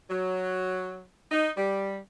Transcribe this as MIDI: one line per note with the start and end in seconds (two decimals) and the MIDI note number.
0.10 1.02 54
1.30 1.49 63
1.56 1.96 55